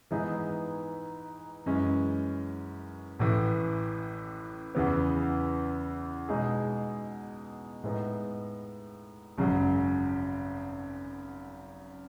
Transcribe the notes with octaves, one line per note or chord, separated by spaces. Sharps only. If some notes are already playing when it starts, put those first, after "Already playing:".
G#2 E3 B3 D#4 G#4
F#2 E3 G#3 C#4
A1 A2 E3
E2 C#3 E3 B3
B2 G#3 D#4 G#4
A2 G#3 B3 D#4
G#1 F#2 C#3 F#3